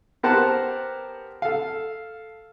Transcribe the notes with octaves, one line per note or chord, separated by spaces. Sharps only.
B3 G4 A#4 C5 F#5 A5
A4 F5